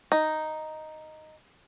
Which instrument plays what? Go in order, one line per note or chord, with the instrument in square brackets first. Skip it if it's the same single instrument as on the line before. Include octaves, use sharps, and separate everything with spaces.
[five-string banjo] D#4